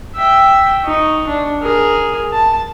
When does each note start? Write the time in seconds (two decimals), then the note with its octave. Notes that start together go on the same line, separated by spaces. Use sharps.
0.16 E5 G5
0.84 D#4 C#6
1.27 D4
1.61 G#4 A#4
2.32 A5